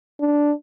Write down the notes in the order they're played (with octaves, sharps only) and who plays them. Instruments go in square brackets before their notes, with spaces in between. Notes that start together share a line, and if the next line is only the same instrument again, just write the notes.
[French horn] D4